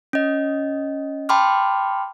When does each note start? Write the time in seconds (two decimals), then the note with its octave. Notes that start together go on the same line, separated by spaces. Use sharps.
0.13 C#4 D#5
1.29 G5 A5 B5 C6 D6 F6